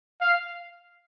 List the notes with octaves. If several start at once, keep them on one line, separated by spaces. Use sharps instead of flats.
F5